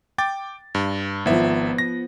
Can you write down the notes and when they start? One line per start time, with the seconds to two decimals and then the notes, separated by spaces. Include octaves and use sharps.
0.18 G5 D6 A6
0.75 G2
1.26 G#1 F3 B3 E5
1.78 A#6